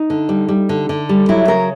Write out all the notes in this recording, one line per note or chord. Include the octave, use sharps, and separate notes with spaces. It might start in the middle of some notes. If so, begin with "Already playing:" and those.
Already playing: D#4
D3
G3
G3
D3
D3
G3
F#3 E4
C#3 A#4